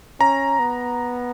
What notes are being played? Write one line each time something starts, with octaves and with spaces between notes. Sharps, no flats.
C#4 A#5
B3